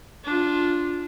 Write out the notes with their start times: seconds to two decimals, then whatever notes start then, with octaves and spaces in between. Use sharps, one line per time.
0.25 D4 F4